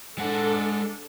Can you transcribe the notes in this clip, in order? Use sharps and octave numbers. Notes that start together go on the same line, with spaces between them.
G#3 D4 A4 F#5